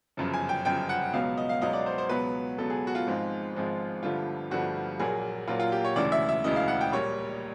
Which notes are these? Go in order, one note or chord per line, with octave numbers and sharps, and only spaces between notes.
G1 F#2 C#3 F3
G#5
G5
G1 F#2 C#3 F3 G5
F#5
C#2 B2 F#3 B3 F5
D#5
F5
C#2 B2 F#3 B3 D#5
D5
C5
C5
C#2 B2 F#3 B3 B4
C#2 B2 F#3 B3 A4
G#4
F#4
F4
G#1 G#2 F3 G#3 C4
G#1 G#2 F3 G#3 C4
G1 G2 D3 F3 A3 F4
G1 G2 D3 F3 A3 F#4
A#1 A#2 F#3 A#3 G#4
A#1 A#2 F#3 A#3 F4
F4
G4
C#5
E1 D2 C#3 E3 D5
E5
E5
E1 D2 C#3 E3 D#5
F5
F#5
G5
A#1 A#2 G3 A#3 C#5